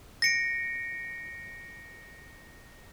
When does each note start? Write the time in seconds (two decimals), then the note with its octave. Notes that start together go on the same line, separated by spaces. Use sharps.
0.22 A#6 C#7 D7